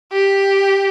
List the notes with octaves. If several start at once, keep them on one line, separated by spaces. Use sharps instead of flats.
G4